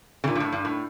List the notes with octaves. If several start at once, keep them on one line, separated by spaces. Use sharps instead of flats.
C#3
A#2
G2
A2
G2
A2